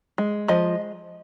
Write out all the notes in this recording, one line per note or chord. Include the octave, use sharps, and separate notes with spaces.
G#3
F3 D#5